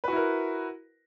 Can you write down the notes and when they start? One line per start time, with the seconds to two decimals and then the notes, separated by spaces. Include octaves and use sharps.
0.04 B4
0.08 F#4
0.12 E4
0.16 A#4